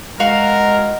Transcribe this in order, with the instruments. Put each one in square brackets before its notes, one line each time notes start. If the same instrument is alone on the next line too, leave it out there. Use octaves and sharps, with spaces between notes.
[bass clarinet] G#3 [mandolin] F#4 F5 [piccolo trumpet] A#4